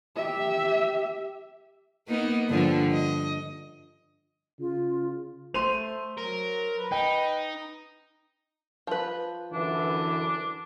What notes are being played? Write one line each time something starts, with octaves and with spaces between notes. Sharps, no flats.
G4 E5
A#3 B3 D#4
G2 D3 F3
D#5
C#3 F4
A3 C5 C6 D#7 F7
F#3 A#4
B4
D#4 G5
F3 B4
F#2 D3 E3 D4